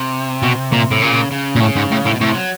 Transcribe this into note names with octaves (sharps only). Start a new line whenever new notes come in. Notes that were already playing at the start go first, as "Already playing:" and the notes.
Already playing: C3
B2
A#2
A2
A#2 C#3
C#3
A#2
A2 C#3
G#2
A2
A2
B2
A2 C3
F#3